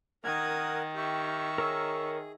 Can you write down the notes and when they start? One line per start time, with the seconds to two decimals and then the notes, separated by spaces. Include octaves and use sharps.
0.24 D#3 A#4 F#5 D#6 G#6
0.95 G4 E5 C#6
1.58 G#4 A#4 C#5 E6